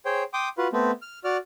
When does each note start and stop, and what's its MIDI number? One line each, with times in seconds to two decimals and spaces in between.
0.05 0.23 68
0.05 0.23 72
0.05 0.23 73
0.05 0.23 79
0.33 0.49 79
0.33 0.49 84
0.33 0.49 86
0.33 0.49 87
0.58 0.68 65
0.58 0.68 66
0.58 0.68 71
0.73 0.91 57
0.73 0.91 59
0.73 0.91 60
1.02 1.19 89
1.24 1.37 66
1.24 1.37 74
1.24 1.37 89